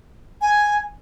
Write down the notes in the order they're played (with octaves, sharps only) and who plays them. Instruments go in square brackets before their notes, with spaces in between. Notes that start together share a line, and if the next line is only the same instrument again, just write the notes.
[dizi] G#5